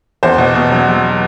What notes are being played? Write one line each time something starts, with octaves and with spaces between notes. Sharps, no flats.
E2 C5
B2
B2
F#3
F#3